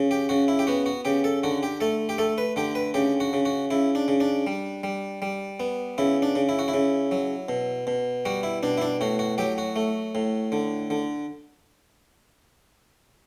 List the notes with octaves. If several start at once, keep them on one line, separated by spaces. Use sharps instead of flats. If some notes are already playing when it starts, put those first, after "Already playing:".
Already playing: C#3
G4
C#3 F#4
E4
G4
B3 F#4
F#4
C#3 G4
A4
D3 F#4
G4
A3 A4
G4
A3 A4
B4
D3 G4
B4
C#3 G4
F#4
C#3
F#4
C#3 E4
D4
C#3
D4
G3
G3
G3
B3
C#3 E4
D4
C#3
E4
F#4
E4
C#3
F#3
B2
B2
G3 F#4
E4
B2 D4
E4
D4
A2 F#4
F#4
F#3 G4
F#4
A3
A2
D3
D3